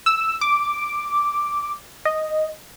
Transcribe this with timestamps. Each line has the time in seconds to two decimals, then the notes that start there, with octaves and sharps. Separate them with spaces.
0.06 E6
0.41 D6
2.05 D#5